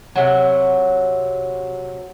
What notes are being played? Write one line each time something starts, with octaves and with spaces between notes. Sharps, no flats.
C3 F#3